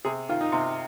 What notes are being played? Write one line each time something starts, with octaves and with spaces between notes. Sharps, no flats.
C3 G#4
D#3 F4
D#4
C3